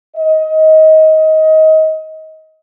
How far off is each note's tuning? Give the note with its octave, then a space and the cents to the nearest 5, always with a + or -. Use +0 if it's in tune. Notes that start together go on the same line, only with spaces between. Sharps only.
D#5 +20